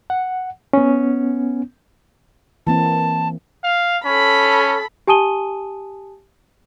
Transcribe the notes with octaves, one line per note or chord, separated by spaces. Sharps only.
F#5
B3 C#4
E3 A#3 C4 A5
F5
C#4 A4 B5
G4 G#5 A5 D#6 D#7 G7